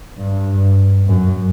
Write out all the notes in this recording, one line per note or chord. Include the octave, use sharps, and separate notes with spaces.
G2
F#2